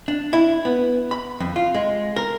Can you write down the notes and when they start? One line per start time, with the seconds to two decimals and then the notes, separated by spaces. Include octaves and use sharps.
0.08 D4
0.33 E4
0.65 B3
1.11 B5
1.40 F2
1.56 F4
1.74 G#3
2.16 A#4